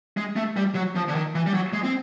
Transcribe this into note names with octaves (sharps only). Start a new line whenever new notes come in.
G#3
A3
G3
F#3
F3
D3
D#3
E3
G3
F#3
G#3
C4